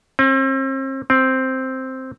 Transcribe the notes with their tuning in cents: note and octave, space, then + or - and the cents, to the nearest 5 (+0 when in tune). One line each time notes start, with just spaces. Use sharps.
C4 +40
C4 +0